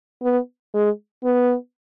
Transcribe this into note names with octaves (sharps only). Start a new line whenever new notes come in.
B3
G#3
B3